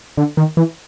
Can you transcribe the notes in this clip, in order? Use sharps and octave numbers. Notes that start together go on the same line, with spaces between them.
D3
D#3
E3